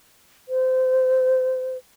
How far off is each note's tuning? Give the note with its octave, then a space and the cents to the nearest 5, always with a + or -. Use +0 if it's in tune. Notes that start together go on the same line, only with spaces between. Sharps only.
C5 -25